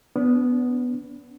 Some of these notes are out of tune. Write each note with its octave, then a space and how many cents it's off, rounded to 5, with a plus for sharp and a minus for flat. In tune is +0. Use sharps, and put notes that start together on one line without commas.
B3 +5 D4 -40